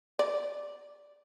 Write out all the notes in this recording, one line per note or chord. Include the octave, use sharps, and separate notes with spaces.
D5